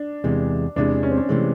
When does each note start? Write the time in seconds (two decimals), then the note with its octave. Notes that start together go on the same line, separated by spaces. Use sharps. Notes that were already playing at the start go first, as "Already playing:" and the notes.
Already playing: D4
0.24 E2 C3 E3 G#3
0.76 E2 C3 E3 G#3 D4
1.03 C#4
1.11 C4
1.18 C#4
1.29 C3 E3 G#3 A3